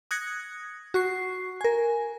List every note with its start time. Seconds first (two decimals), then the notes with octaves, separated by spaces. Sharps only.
0.11 D#6 F#6 G#6 A#6 C#7
0.94 F#4 C#6 C7
1.61 A#4 G#5